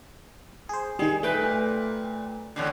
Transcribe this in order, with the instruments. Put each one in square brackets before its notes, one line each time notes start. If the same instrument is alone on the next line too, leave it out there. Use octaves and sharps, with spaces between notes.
[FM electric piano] G#4 C5
[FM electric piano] D#3 G3 [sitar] G#4
[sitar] A#2 B4 [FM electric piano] A3 G5
[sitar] E2 A2 D3